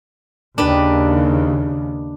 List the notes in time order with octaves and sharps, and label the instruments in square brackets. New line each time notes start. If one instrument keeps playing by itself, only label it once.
[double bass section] D#2 C#3 [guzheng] D4 B4 G5